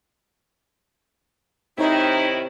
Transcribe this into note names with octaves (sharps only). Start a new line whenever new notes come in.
C3 D#3 D#4 E4 C#5 C6